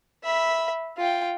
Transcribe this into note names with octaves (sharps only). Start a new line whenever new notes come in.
E5 B5
F4 G5